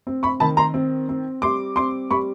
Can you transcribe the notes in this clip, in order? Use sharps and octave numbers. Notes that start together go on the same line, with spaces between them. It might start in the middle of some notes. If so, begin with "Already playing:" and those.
C4
B5 C#6
D#3 A5 B5
A#5 C6
C4
C4
G3 C6 D6
C4 C6 D6
G3 B5 C#6